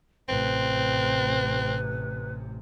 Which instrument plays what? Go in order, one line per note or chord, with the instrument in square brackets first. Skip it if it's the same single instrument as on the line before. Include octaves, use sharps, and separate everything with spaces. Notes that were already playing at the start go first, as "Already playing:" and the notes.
[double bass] A1 C3 [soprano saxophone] C4 [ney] B4